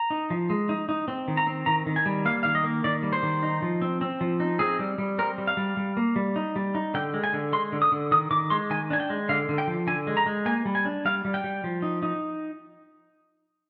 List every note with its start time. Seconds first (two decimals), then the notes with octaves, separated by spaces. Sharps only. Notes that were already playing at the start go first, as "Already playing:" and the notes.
Already playing: A#5
0.10 D#4
0.30 F3
0.50 G#3
0.69 D#4
0.89 D#4
1.08 C4
1.28 D#3
1.37 A#5
1.47 C4
1.66 D#3 A#5
1.86 D#3
1.96 G#5
2.06 G3
2.25 A#3 F5
2.43 D#3 F5
2.55 D#5
2.64 A#3
2.84 D#3 D5
3.03 G3
3.13 C5
3.23 D#3
3.43 D#4
3.62 F3
3.82 C4
4.01 C4
4.21 F3
4.40 D#4
4.59 C4 G#4
4.79 G3
4.98 G3
5.19 C4 A#4
5.38 G3
5.47 F5
5.57 G3
5.77 G3
5.97 A#3
6.16 G3
6.36 D#4
6.56 G3
6.75 D#4
6.94 D3 G5
7.14 G#3
7.24 G#5
7.33 D3
7.53 G#3 C6
7.72 D3
7.82 D#6
7.92 D3
8.11 D#3 D#6
8.31 D#3 D6
8.50 G#3 C6
8.70 D#3 G#5
8.90 D4 G#5
9.00 G5
9.10 G#3
9.29 D3 F5
9.49 D3
9.58 G5
9.67 F3
9.87 D3 G#5
10.07 G#3
10.17 A#5
10.26 G#3
10.46 A#3 G#5
10.66 G3
10.75 G#5
10.85 D4
11.05 G3 F5
11.25 G3
11.34 G5
11.44 G3
11.64 F3
11.82 D#4
12.03 D#4